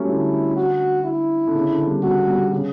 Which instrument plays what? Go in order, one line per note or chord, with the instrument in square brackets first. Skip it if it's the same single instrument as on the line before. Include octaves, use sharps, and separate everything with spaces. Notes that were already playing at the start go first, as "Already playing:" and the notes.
Already playing: [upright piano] F#3 G3 A3 C#4
[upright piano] D3 [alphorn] E4
[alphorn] F#4
E4
[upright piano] D3
C#3
D3
G3
[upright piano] G3 [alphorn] F#4
[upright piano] G3
C#3